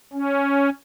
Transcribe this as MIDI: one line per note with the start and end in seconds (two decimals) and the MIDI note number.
0.13 0.69 61